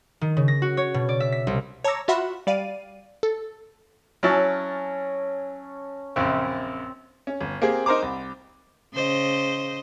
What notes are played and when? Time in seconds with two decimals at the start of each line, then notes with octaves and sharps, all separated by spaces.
0.21 D#3
0.37 C#3
0.48 A#6
0.62 F#4
0.77 C#5
0.94 B2
1.09 D5
1.20 E5
1.32 B6
1.47 C2
1.84 C#5 A5 A#5 D6 E6 A#6
2.08 F4 F#4 E5 F#5 B5 C6
2.47 G3 D5 F5 D#7
3.23 A4
4.23 F#3 C#4 E4 A5
6.16 A#1 F#2 C#3 C4
7.27 C#4
7.41 G1
7.62 A#3 C4 G4 G#4
7.86 D#4 A#4 C5 A#5 D6
8.02 C2
8.94 C#3 C5 D#5